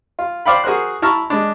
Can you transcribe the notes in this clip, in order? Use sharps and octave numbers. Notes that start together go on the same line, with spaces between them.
F4
C5 D5 F5 G5 B5
F#4 G#4 A#4 C5 F#6
E4 A5 A#5 C#6 F6
G#3 D4